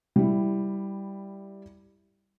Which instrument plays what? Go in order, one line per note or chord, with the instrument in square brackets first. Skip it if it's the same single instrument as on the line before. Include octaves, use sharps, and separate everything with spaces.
[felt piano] G3 E4